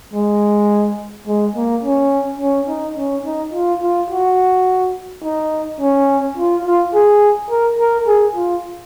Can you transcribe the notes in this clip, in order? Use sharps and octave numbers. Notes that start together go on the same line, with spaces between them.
G#3
G#3
A#3
C#4
C#4
D#4
C#4
D#4
F4
F4
F#4
D#4
C#4
F4
F4
G#4
A#4
A#4
G#4
F4